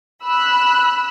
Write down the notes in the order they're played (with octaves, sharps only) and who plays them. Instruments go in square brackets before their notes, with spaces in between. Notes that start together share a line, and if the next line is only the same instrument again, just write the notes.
[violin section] B5 E6 F#6